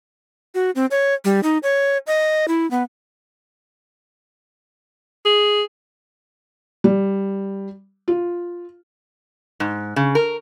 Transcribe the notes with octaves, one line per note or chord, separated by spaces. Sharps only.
F#4
C4
C#5
G3
D#4
C#5
D#5
E4
B3
G#4
G3
F4
G#2
C#3
A#4